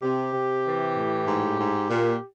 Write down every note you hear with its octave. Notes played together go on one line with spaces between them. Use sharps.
C3 G4
C3
E3
A2
G#2
G#2
A#2